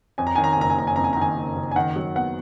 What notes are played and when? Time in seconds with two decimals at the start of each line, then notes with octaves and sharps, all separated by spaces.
0.18 F2 G#5
0.27 A#5
0.36 D#3 G#5
0.44 A#5
0.53 G#5
0.57 F#1 A#5
0.70 G#5
0.77 F#1 A#5
0.87 G#5
0.96 F2 A#5
1.04 G#5
1.13 A#5
1.17 D#3 G#5
1.36 F#1
1.56 F#1
1.71 G#5
1.76 D#3 F#5
1.96 F#3
2.15 B3 F#5